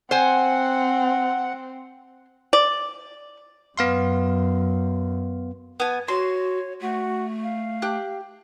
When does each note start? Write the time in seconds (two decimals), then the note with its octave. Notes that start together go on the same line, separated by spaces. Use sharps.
0.11 C4 C5 F#5 G#5
2.53 D5
3.78 F#2 B3 F5 C6
5.80 B3 G#5
6.08 F#4 C#5 C6
6.81 A3 F#4
7.43 F5
7.82 G4 F#6